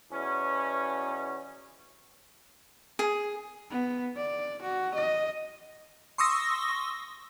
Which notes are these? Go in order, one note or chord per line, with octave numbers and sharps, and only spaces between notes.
E2 B2 C#4
G#4
B3
D5
F#4
D#5
C6 C#6 D#6 E6 A#6